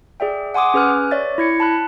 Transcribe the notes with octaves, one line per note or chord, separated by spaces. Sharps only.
G#4 D5 E5 G5
F#5 G#5 C6 D6 D#6
C#4 G#4 B4 G#5 F6 F#6
C#5 D5 E5 A6
E4 G#6 C#7
A5 B5 F#6